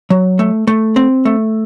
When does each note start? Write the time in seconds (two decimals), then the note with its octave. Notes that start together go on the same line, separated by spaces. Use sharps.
0.10 F#3
0.39 A3
0.67 A3
0.96 C4
1.25 A3